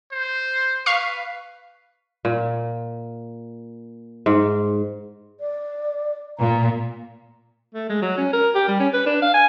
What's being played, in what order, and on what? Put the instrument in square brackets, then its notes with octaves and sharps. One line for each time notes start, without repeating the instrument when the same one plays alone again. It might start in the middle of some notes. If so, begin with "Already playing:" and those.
[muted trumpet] C5
[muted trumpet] B4 [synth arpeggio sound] F5 C#6 C7
[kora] A#2
G#2
[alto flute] D5
[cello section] A#2 [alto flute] A#5
[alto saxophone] A3
G#3
F#3
C#4
A#4
G4
G3
C#4
B4
D4
F5
G#5